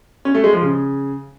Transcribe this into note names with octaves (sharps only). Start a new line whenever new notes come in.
C#4
A3
G#3
F3
C#3